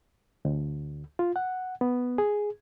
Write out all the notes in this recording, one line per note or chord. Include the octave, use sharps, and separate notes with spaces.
D2
F4
F#5
B3
G#4